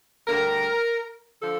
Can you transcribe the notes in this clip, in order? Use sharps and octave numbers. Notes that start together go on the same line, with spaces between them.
D2 D3 G3 A#4
D3 F3 A4